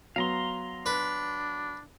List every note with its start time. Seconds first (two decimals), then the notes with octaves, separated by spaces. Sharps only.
0.16 F#3 B3 F5 A#5 C6
0.86 D4 B4